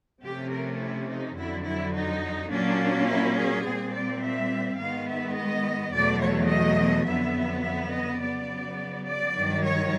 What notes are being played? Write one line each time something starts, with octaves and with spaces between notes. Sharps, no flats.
C3 F3 A3 C#4 G4
A#4
E4
D#4
F2 D3 F#3 E4
E4
D#4
A#2 F#3 A#3 C#4 D4
E4
G#4
A#2 G3 C4
D5
E5
G#2 D#3 G#3 B3 F5
E5
D#5
E2 B2 F#3 A3 D5
C#5
D#5
F2 D3 F#3 B3 E5
E5
D#5
C#3 F#3 B3 D5
D5
G2 D#3 F#3
C#5